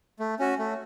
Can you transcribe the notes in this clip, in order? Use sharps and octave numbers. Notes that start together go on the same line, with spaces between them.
A3
C#4 F#4
A3